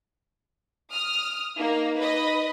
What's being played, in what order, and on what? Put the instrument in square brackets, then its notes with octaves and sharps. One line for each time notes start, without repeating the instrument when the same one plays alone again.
[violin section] D#6 F6
[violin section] A#3 [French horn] D#4
[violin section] B4 D#5 B5